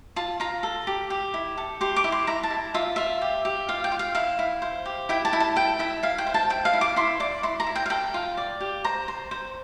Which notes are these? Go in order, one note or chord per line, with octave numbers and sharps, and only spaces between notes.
F4 A5
F4 A#5
A4
G4
G4
E4
A4
G4 C6
D6
E4
C6
E4 A#5
A5
E4
F4 E5
F4 E5
G4
G4
F4 F5
G5
F4
F5
E4 F5
E4
C5
G4
E4 G5
A5
E4
A5
A4 G5
E4 E5
E4 F5
G5
C5
A5
E4 G5
F5
E4
D6
E4 C6
D5 D6
E4 C6
A#5
E4
G5
F5
A4 G5
F4
D5
G4
C5 A#5
C5
C5